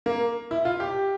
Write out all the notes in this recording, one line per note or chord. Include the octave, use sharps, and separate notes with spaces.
A#3
E4
F4
G4